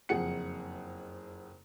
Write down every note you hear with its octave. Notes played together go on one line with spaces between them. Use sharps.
F#1 F2 G#4 F#5 C#7